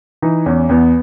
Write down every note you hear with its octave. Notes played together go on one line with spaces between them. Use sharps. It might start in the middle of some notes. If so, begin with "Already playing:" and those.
E3 D#4
E2 C#4
E2 B3